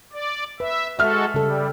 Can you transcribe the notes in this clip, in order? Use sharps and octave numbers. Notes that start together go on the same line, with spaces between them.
D5
B4 E5
G#3 F#4 A4 E5 F6
C#3 G3 A4